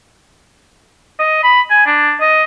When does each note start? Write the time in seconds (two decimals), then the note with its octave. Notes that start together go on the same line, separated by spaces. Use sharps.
1.19 D#5
1.43 B5
1.70 G#5
1.86 D4
2.20 D#5